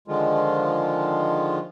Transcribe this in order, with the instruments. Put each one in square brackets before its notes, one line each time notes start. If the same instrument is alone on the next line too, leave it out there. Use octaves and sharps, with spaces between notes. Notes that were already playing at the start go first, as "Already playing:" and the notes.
[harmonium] D3 D#3 F3 G#3 F4